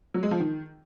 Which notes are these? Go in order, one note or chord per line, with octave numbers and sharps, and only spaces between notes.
F#3
G#3
F3
D#3